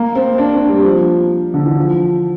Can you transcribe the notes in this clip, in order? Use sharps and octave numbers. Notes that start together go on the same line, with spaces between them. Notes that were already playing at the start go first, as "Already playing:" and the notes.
Already playing: A#3
C4
D4
C4
G3
F3
D3
E3
F3